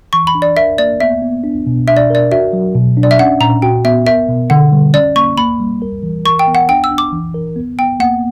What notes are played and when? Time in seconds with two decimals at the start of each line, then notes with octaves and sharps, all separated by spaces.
0.13 E3 C#6
0.27 B5
0.35 D4
0.42 D5
0.57 A#4 E5
0.78 A#3 D5
1.00 B3 E5
1.22 B3
1.44 D4
1.67 B2
1.88 D4 E5
1.97 D5
2.10 A#4 D5
2.32 F#4 E5
2.53 F#3
2.75 B2
2.97 D4
3.03 D5
3.11 E5
3.19 C#4 F#5
3.41 A#2 A#5
3.62 F#4 G5
3.85 B3 E5
4.06 A#4 E5
4.29 B2
4.50 D3 F#5
4.72 G3
4.94 C#4 D5
5.16 A#3 C#6
5.37 A#3 B5
5.60 G3
5.82 A#4
6.03 E3
6.25 A#4 C#6
6.39 G5
6.47 B3
6.55 F#5
6.69 D4 G5
6.84 E6
6.91 D4
6.98 D6
7.13 E3
7.34 A#4
7.56 B3
7.79 B3 G5
8.00 A#3 F#5